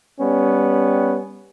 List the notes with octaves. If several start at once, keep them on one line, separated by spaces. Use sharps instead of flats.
G3 B3 C#4